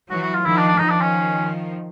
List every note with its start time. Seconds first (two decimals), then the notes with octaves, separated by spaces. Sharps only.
0.11 E3 F#3 F#4
0.23 F#4
0.34 F4
0.45 D#3 F3 E4
0.57 D4
0.68 D4
0.79 D#3 F3 D#4
0.90 D4
1.01 C#4